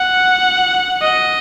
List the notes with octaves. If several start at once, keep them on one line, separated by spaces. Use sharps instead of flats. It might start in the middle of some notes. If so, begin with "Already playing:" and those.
Already playing: F#5
D#5